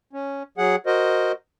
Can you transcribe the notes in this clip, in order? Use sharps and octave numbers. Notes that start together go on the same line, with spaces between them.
C#4
F#3 G#4 F#5
F#4 A#4 C5 D#5